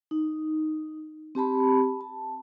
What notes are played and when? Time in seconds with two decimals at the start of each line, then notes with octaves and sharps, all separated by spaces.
0.11 D#4
1.35 C4 G4 A5 B5
2.01 A5